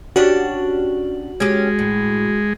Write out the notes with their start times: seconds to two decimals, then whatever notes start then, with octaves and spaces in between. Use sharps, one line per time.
0.16 C#4 D4 F#4 G4
1.40 G#3 C#4 G4
1.79 A2